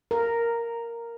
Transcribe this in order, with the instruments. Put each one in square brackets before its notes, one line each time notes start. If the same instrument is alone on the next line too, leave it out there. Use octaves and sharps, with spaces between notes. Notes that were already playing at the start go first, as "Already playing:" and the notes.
[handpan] A#4